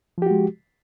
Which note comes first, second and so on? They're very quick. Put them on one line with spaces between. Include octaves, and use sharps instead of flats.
F3 G4 F#4 G#3